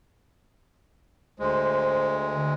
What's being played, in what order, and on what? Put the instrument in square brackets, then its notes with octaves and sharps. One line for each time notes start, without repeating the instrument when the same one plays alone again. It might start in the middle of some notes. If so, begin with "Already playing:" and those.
[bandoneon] D2 G#3 [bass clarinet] C5
[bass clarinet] D3